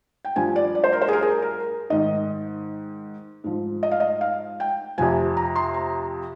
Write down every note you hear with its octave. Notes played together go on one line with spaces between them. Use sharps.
G5
G2 F3 G#5
D5
D5
C5
A#4
C5
G#4
A#4
G#4
A#4
G#2 D#3 D#5
G#2 F3
D#5
F5
D#5
F5
G5
F2 C3 F3 G#5
A#5
C6
A#5